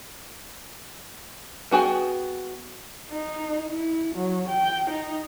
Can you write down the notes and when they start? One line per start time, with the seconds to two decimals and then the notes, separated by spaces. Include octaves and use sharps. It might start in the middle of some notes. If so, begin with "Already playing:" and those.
1.71 B3 F#4 G#4 G5
3.10 D#4
3.69 E4
4.15 F#3
4.49 G5
4.90 D#4